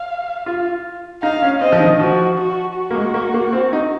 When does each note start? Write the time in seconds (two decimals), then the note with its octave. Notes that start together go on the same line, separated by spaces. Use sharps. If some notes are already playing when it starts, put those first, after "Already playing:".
Already playing: F5
0.46 F4
1.23 D#4 F5
1.42 C#4
1.61 C4 D#5
1.72 F3
1.80 D#3
1.99 F3 F#4
2.39 F#4
2.77 F#4
2.91 A#3
2.95 G#3
3.14 A#3
3.34 A#3
3.53 C4
3.73 D#4